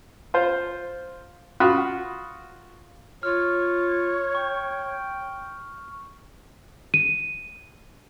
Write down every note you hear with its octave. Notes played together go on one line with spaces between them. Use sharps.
F4 C5
F4 F#4 F#5 B5 D#6
F4 C#5 F6
G5 C#6
D#7